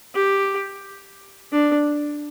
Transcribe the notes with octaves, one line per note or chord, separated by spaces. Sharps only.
G4
D4